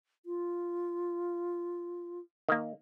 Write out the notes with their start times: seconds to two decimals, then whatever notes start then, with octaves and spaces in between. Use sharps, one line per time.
0.26 F4
2.49 D#3 A#3